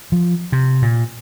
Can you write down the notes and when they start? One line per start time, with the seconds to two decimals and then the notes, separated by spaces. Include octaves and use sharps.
0.12 F3
0.52 C3
0.82 A#2